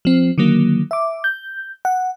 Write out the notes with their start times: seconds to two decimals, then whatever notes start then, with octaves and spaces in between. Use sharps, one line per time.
0.05 F3 C4
0.38 D3 D#3 F#3 A#3
0.91 E5 D6
1.24 G6
1.85 F#5